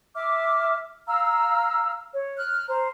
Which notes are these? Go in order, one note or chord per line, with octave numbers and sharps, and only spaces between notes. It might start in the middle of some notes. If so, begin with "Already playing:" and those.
E5 D6 F6
F5 A#5 E6 F6
C#5
F6 F#6
C5 A#5